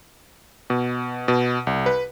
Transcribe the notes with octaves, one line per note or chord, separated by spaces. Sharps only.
B2
B2
C2
B4